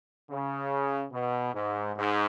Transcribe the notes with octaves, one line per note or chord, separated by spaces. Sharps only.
C#3
B2
G#2
G#2